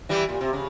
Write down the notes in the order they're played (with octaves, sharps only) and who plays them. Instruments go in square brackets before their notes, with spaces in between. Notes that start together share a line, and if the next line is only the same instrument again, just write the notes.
[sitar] E3 G3
A#2
C3
C#3